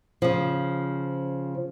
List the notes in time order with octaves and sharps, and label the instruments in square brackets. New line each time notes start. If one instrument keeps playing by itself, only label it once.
[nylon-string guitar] C#3 F3